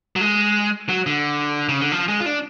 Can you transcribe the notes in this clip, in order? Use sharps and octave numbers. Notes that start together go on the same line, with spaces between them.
F#3
G#3
F#3
D3
C#3
D3
F3
G#3
F4
D4